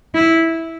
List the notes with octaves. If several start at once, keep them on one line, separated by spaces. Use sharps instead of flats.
E4